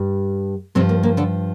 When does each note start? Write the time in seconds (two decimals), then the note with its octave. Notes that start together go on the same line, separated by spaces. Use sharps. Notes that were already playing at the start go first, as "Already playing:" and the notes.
Already playing: G2 G3
0.75 G2 C3 F3 C4
0.89 A#3
1.03 A#3
1.17 D3 D4